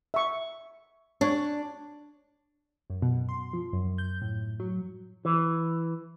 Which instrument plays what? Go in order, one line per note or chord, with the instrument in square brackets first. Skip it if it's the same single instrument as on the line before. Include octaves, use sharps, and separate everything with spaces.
[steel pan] E5 C#6
[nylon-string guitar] D4 [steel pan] C#5
[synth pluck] F#2
B2
C6
F3
F#2
G6
A2
F#3
[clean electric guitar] E3